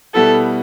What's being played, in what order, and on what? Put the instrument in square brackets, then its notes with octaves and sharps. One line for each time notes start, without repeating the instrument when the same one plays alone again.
[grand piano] B2 G3 B3 E4 [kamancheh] A4